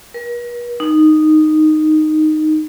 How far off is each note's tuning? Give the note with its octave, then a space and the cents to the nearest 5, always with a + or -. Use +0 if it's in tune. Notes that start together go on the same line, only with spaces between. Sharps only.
A#4 +40
D#4 -10